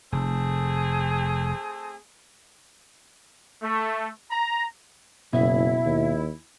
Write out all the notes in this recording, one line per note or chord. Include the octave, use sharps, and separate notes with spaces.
F1 A3 C4 G#4
A3
A#5
F#1 B2 E4 E5
D#2